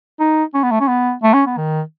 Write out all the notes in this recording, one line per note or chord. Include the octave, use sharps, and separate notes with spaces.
D#4
C#4
B3
A3
C#4
B3
A3
C#4
B3
D#3